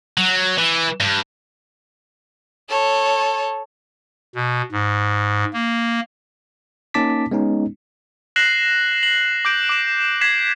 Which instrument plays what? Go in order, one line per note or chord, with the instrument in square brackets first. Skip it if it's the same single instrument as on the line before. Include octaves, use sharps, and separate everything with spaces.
[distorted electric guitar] F#3
E3
G2
[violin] A4 C#5
[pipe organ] B2
G#2
A#3
[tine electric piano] A#3 C#4 D#4 A5 D6 B6
G#3 B3 C#4 D#4
[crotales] F#6 A#6 C7 E7 F#7
F#7
D6 G6 D7
D6 E7
G#6 B6 C7 E7